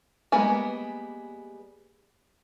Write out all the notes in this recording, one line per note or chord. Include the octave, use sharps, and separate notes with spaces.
G3 G#3 A#3 B3 G#5